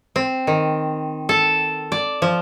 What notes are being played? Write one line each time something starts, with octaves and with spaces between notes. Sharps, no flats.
C4
D#3
A4
D5
F3